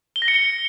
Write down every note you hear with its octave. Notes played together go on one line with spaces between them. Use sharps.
G7
A#6
C#7
G7